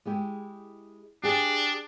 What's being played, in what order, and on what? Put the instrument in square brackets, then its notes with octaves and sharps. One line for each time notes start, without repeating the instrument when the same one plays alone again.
[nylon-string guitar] G#3 E4 G4
[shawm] D4 [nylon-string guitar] G4 G#4